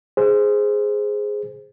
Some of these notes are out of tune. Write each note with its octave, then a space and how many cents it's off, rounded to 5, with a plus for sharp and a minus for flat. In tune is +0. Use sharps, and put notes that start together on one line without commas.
G#4 +0 C5 +0